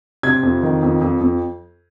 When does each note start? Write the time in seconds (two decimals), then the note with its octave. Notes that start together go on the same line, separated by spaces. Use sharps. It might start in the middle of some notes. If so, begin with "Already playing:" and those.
0.23 C3 G#6
0.43 F2
0.63 D#3
0.82 F2
1.01 F2
1.21 F2